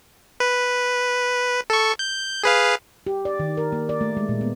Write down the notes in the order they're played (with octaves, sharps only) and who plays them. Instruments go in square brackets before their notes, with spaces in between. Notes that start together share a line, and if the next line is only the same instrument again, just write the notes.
[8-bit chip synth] B4
A4 C#6
G6
G#4 B4 F5
[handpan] G4
D5
D#3
A#4
A#3
D5
A3
G#3
A#2
B3